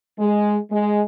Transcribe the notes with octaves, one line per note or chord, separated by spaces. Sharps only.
G#3
G#3